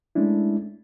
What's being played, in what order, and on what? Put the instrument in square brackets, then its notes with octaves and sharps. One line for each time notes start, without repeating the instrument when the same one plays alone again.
[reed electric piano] G#3 A3 C#4 D4 E4